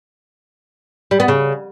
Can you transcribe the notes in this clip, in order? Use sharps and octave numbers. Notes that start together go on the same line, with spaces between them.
G3
B3
C#3